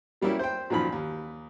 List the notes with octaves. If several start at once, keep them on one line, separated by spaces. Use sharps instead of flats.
F#3 G3 A#3 C#4 E4 G4
C5 G5
F#2 A#2 D#3 F3 B5
D#2